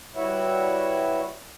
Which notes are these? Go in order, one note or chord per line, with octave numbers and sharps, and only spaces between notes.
G3 E4 F#4 B4 C#5 E5